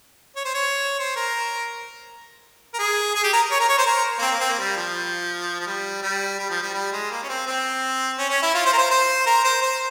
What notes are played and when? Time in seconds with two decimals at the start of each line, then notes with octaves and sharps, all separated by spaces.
0.36 C#5
0.45 C5
0.54 C#5
0.99 C5
1.16 A#4
2.74 A#4
2.79 G#4
3.15 G#4
3.24 G4
3.33 A#4
3.51 C#5
3.60 A#4
3.69 C#5
3.78 C5
3.86 A#4
4.19 A#3
4.22 C4
4.31 A#3
4.41 C4
4.49 A#3
4.59 G3
4.77 F3
5.61 F3
5.66 G3
6.03 G3
6.39 G3
6.50 F3
6.63 G3
6.74 G3
6.93 G#3
7.11 A#3
7.23 C#4
7.29 C4
7.47 C4
8.18 C#4
8.30 C#4
8.43 E4
8.54 F4
8.66 C5
8.73 A#4
8.78 C5
8.90 C5
9.27 A#4
9.44 C5
9.62 C5